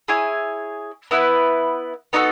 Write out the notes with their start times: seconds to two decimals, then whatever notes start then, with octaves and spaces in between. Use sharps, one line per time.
0.08 E4 G#4 C#5 G#5
1.11 B3 E4 B4
2.13 B3 D#4 F#4 A4